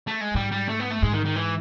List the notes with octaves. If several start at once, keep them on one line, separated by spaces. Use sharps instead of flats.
A3
G#3
G#2 G3
G3
A3
B3
A3
G#2 G#3
D#3
D#3
E3